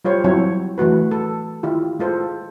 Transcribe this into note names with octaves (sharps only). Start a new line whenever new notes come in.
G3 F4 C5 C#5
F#3 C4 E4 C#5
E3 A3 F#4 B4
A4
D#3 E4 F4 G4
G#3 F4 A4 C5